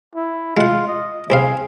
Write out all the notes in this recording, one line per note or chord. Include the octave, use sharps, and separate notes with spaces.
E4
G#3 F4 F#5
D#5
C2 C4 G#4 F5